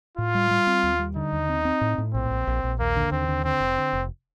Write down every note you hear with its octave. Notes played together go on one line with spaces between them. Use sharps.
A2 F4
G3
G3
C4
D#2
G3
D3 D#4
D#2
C4
C4
A2
A2
A#1 C4
A#1
A#1
A#1
D#2 A#3
D3
D#2 C4
D3
D3 C4
F1
D3
F1